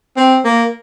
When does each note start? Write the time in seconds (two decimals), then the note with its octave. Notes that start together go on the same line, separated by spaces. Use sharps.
0.17 C4
0.44 A#3